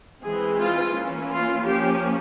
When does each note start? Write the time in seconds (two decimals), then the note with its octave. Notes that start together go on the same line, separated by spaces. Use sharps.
0.21 E3 G#3 C4 G#4
0.56 F4
0.93 E3 A#3 C#4
1.29 F4
1.64 F3 A#3 C#4 G4